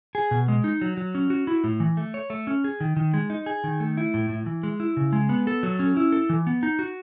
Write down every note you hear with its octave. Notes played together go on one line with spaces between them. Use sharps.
G#4
B2
G#3
D#4
F#3
F#3
C#4
F#4
E4
A2
E3
A3
C#5
A3
C#4
G#4
D#3
D#3
G#3
D#4
G#4
D#3
A3
E4
A2
A2
E3
G#3
E4
C#3
G#3
B3
A4
F#3
C#4
E4
A4
E3
B3
D#4
F#4